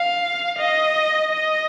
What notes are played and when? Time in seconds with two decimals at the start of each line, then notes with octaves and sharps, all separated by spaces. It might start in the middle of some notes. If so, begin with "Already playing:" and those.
Already playing: F5
0.59 D#5
1.31 D#5